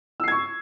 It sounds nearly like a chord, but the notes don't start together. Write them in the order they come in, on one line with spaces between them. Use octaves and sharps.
E6 C7 G#6 C#6